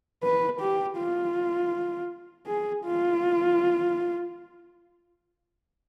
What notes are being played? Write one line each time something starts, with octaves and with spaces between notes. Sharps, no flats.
B4
G4
F4
G#4
F4